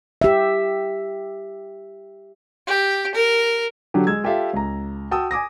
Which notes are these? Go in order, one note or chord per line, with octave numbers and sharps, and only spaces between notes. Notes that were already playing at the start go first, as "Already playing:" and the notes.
G4 E5
G4
A#4
D3 F#3 D4 F#4 G4
G#3 E6 G#6
F4 G4 A4 E5 F5
C#2 A#5
F#4 G5 A5 D#6 E6
G#5 D6 D#6 A#6